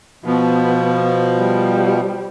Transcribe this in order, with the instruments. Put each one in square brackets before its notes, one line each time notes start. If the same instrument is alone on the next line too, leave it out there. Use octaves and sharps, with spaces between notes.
[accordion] B2 F3 [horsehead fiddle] B3
[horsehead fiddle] G3